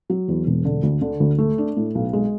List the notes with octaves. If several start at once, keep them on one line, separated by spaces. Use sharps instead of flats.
F#3
E2
E1
D3
D2
D3
D2
A3
D4
A2
B1
G#3